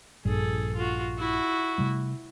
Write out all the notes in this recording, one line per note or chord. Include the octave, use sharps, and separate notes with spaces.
A#1 G2 G3 G#4 A4
F4 F#4
E4 F#4
C3 G3 A3